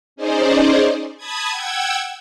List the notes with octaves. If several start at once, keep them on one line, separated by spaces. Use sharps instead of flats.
C#4 D#4 G#4 C5 D5 D#5
A5 B5 D#6 G#6
F#5 G5 E6 G#6